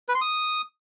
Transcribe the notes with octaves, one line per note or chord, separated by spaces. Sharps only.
B4
C6
D#6